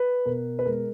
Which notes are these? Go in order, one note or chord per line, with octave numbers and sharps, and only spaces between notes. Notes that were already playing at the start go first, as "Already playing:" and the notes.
Already playing: B4
B2 A#4
B4
G#3 A#4